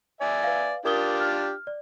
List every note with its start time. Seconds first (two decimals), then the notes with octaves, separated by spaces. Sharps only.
0.21 D5 E5 G#5
0.43 B4 F5
0.85 D4 F4 G4 A#4 D#6 G7
1.20 F6
1.67 D5